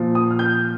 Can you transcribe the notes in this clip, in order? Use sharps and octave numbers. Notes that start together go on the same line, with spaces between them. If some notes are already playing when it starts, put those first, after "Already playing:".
Already playing: A#2 F3
D#6
F6
G6
F6